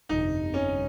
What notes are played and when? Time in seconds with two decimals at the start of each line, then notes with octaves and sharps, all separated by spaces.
0.09 G1 F2 C3 D#4
0.54 C#4